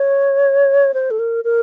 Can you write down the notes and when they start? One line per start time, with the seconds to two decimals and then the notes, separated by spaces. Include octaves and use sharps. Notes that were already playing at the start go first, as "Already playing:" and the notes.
Already playing: C#5
0.94 C5
1.11 A4
1.19 A#4
1.44 A#4